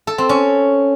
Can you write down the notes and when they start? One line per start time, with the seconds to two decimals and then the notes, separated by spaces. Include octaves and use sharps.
0.07 A4
0.18 C4
0.29 C#4